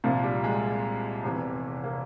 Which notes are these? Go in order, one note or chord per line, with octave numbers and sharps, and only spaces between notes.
C2 A#2 F3
G3
G#3
F1 E2 C3 E3
A#3